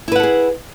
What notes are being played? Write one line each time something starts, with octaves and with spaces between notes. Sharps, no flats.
E4 G#4 A4 B4 F#5